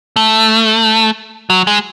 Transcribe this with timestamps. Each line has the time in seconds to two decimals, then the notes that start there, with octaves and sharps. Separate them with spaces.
0.16 A3
1.50 F#3
1.67 G#3